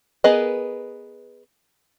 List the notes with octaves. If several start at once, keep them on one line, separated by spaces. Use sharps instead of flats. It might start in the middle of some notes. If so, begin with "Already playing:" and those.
B3 G#4 A#4 B4 D#5